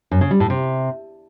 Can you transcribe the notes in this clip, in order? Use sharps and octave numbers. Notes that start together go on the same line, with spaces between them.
F#2
C#3
G3
A2
C3